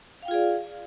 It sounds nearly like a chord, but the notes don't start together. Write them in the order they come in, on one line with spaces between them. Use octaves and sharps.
F5 G5 F4 G#4 D5